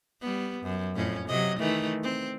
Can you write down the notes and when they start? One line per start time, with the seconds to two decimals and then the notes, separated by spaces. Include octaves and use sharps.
0.21 G3 B3
0.63 F#2
0.96 F2 A2 C#4
1.28 C3 F#3 D#5
1.59 D#3 E3 A3
2.03 C4